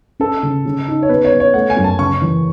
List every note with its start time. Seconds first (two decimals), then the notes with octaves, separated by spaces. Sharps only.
0.20 C#4 A4
0.43 C#3
0.66 C#3
0.88 D#4
1.03 C#5
1.09 B3 B4
1.25 C#5
1.33 B3
1.40 C#5
1.54 A3 F#5
1.70 G#5
1.77 F#2
1.84 A5
1.99 C#3 C#6
2.21 E3